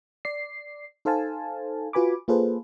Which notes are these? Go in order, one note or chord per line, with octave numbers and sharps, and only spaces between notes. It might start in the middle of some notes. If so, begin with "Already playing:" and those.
D5 C7
D#4 A4 C5 F5 G#5 A5
F4 F#4 B4 G#5 B5 D6
A#3 F4 G#4 A4 B4 C5